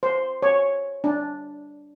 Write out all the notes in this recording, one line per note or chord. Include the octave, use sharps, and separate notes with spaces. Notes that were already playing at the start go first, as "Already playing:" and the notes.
C5
C#5
D4